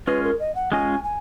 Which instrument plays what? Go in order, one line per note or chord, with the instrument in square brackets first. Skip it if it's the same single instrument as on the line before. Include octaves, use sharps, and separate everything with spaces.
[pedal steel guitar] G#3 C#4 F4 G#4 D#5 [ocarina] B4
[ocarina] A#4
D#5
F#5
[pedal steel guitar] G#3 C#4 F4 G#4 D#5 [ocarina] G#5
[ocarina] G#5